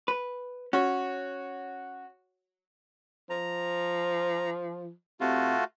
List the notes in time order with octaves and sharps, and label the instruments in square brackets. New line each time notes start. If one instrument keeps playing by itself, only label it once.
[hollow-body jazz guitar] B4
[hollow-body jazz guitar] C#4 [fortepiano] F#4 C#5
[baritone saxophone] F3 [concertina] A#5
[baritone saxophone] C3 [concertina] A3 F4 F#4